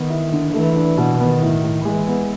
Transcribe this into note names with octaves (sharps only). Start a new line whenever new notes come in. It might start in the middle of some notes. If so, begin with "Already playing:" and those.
Already playing: D#3 B3
E4
D3
E3 A3
D4
B2
D#3 B3
A2
A2
E3 G#3
B3